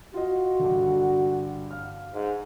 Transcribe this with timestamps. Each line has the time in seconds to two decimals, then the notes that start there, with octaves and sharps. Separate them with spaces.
0.14 F4 F#4 D#5
0.60 G2 D3
1.71 F5 F6
2.14 G#2